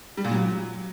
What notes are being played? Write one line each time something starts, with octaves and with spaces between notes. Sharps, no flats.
G3
A#2
F#3